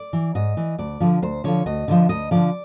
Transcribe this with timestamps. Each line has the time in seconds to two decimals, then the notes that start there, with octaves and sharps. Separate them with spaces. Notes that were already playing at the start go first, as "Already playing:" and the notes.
Already playing: D5
0.13 E3
0.35 G#2 D#5
0.57 E3
0.78 D2 D5
1.00 D3 F3
1.22 D2 C5
1.44 D3 F3 C#5
1.66 D2 D#5
1.88 D3 F3
2.09 D2 D#5
2.31 D3 F3 D5